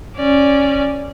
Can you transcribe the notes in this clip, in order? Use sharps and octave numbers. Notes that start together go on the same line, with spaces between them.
C#4 D5